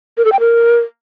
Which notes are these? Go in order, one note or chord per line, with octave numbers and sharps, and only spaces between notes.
A#4
A4
G5
A#4